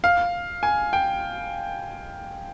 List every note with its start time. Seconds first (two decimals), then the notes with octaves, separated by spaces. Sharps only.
0.04 F5
0.63 G#5
0.93 G5